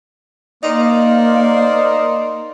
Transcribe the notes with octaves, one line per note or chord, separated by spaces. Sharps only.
A#3 D#4 A#4 C5 D5